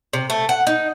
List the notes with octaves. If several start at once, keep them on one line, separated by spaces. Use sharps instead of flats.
C3
A3
F#5
D#4